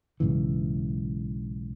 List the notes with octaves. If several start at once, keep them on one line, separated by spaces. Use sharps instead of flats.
B1 G#2 C#3 E3